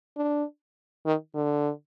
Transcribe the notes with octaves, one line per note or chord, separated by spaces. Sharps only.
D4
D#3
D3